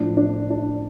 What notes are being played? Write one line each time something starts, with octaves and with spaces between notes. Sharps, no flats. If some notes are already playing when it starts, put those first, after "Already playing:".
Already playing: A2 F3 D4
D4
D4